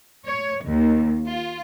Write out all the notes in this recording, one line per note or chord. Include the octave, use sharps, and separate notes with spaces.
C#5
D#2
F4